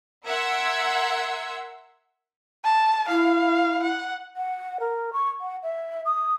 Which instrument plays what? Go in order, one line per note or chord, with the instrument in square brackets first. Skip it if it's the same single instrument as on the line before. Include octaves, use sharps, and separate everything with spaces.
[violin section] A#4 E5 F#5 C6 E6 G#6
[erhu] A5
[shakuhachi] E4 [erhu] F5
[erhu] F#5
[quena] F#5
A#4
C#6
F#5
E5
D#6